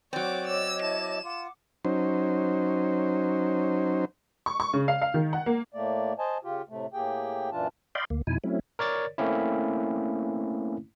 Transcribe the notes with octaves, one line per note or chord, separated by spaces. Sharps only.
F#3 C4 C#5 D5 D6
C#5 D#5 D6 E6
E4 A5 E7
F4 F#5 D6
F#3 C#4 D#4 C5
C#6
C#6
C#3
F5
F5
D#3
F#5
A#3
A2 A3 A#3 D5
C5 D#5 G#5 A5
C#3 F4 G4
A2 C3 A3
A2 A#3 G4 G#4 G5
F#2 A#2 E3 D4 F4 A5
D5 D#5 F5 G5 B5 C6
D2 A#3
F2 B2 D#4 E4 G#5
F#3 A3 C4 C#4 E4
A#4 C#5 D5 A6
A3 A#3 C4 C#4 E4